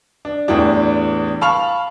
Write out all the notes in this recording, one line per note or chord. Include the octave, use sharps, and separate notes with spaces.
D4
E2 A2 E3 G3 D4
F5 A5 B5 C#6 F6 F7